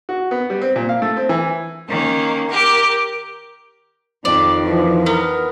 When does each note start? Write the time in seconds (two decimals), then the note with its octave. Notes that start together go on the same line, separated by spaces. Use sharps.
0.09 F#4
0.31 B3
0.50 G3
0.62 C4
0.76 A#2
0.89 F5
1.02 A3
1.17 C4
1.29 E3
1.87 D#3 A#3 C#4
2.49 G4 A#4
4.25 F2 D#3 D5
4.66 E3 F3
5.06 B3 A#4